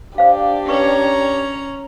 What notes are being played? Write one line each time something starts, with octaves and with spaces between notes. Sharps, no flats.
D4 G4 C5 F5
C#4 B4 C#5 A#5 C#6